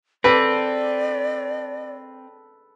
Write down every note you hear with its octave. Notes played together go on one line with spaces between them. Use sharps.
C4 A4 B4 D5 D6